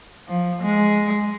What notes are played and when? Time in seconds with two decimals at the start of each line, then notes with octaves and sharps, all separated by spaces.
0.28 F3
0.62 G#3